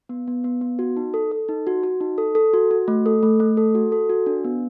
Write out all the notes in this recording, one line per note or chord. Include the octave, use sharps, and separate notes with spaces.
B3
B3
B3
B3
F#4
D#4
A4
A4
D#4
F#4
F#4
D#4
A4
A4
F#4
F#4
A3
A4
A3
A3
A4
F#4
A4
F#4
D4
B3